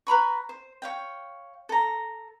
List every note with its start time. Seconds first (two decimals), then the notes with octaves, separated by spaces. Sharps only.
0.07 B4 A#5 B5 C#6
0.49 C5
0.82 C#5 F5 G5
1.69 A4 A#5